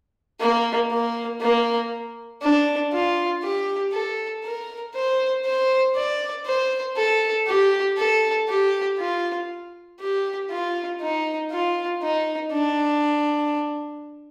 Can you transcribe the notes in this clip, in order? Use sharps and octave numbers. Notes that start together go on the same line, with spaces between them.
A#3
A#3
A#3
D4
F4
G4
A4
A#4
C5
C5
D5
C5
A4
G4
A4
G4
F4
G4
F4
D#4
F4
D#4
D4